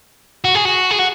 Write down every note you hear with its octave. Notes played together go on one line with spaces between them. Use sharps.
F#4
G#4
F#4
G#4
F#4